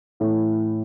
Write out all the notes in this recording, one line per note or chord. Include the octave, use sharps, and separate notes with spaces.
A2 E3